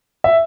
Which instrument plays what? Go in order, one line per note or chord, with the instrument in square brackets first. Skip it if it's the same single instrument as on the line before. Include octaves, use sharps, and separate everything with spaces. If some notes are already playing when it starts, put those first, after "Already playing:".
[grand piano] E5